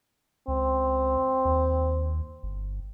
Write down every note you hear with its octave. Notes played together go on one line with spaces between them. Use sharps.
C#2 C4
D#2
G1